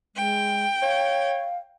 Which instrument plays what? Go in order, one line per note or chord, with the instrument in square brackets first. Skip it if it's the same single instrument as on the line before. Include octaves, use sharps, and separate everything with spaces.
[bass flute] G#3 [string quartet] G5
[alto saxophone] C#5 [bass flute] F5